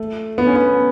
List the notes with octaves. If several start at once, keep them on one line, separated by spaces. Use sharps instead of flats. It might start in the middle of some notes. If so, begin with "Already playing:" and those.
Already playing: A3
B3
C#4
B3